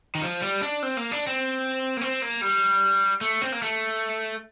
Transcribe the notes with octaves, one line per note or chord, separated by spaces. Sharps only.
D#3
F3
G3
D4
C4
A#3
D4
C4
A#3
C4
A#3
G3
A3
C4
A#3
A3